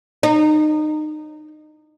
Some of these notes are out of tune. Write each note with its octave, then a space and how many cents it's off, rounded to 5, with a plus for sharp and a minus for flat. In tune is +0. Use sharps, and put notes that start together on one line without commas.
D#4 -25